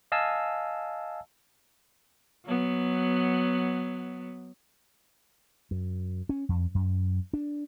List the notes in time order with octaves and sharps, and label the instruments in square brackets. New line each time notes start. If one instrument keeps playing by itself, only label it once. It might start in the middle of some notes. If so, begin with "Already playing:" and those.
[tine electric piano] D#5 F5 G#5 A5 E6
[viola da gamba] F#3 B3
[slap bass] F#2
C#4
F2
F#2
D4